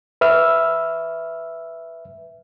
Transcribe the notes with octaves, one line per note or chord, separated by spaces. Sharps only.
B4 E5 E6 F6